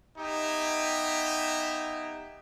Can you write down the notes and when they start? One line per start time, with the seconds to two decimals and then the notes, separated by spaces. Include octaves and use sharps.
0.17 B3 D#4 G4 E5 G#5